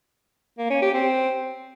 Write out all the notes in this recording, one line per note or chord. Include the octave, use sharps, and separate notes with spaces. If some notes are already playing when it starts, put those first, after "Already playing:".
A#3
C#4
G4
C4